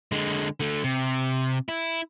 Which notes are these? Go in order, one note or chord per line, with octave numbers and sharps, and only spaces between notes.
D3 G#3
D3 A3
C3
E4